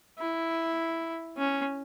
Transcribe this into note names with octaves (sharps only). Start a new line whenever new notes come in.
E4
C#4